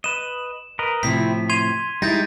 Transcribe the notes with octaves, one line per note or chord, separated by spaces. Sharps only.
B4 D#5 E7
A#4 B4 D#5
A2 C3 F3 C4 E4 B6
C6 G#6 D#7 F7
G3 G#3 D#4 E4 G6 A6 A#6